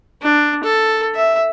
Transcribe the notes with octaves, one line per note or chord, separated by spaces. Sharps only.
D4
A4
E5